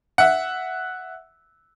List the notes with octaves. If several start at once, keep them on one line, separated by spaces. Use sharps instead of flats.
E5 F#5